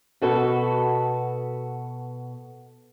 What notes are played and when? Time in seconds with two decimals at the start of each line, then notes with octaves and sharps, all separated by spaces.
0.22 B2 F#4 A4 B4